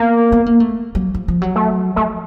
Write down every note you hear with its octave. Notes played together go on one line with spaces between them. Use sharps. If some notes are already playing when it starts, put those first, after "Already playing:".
Already playing: A#3 B3
B3
A#3
A3
F#3
F3
F3
F#3
A3
F3 A3